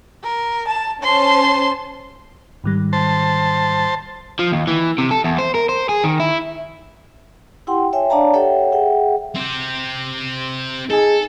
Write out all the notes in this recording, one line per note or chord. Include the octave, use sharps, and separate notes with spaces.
A#4
A5
C#4 C5 A5 C6
G#2 D#3 G3
C5 A5
F3
D#2
E3
C3
A4
E2
C5
A#4
C5
G#4
D#3
E4
E4 G4 F#5 G5 C6
C#5 E5 G5 G#5
D4 C#5 D5 F5 A5 A#5
G4 A4 C#5 E5 F#5 G5
G#4 E5 F#5 G5
C4 G4
D#4 G#4 A4